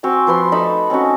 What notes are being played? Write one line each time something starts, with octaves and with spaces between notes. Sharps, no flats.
C4 F#4 G#5
F3 B4 C5 C6
A3 D#4 A5 B5
C4 C#4 D#4 F#4